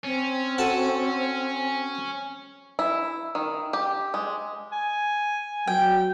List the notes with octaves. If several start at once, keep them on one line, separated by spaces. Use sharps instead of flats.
C4 C#4
F#4 A4 A5
E4
D#3
G4
G#3
G#5
F#3 G5